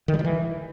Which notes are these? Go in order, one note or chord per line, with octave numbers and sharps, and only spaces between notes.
D#3
G3
D#3
E3